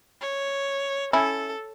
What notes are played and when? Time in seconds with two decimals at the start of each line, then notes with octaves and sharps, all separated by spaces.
0.21 C#5
1.13 C#4 E4 A4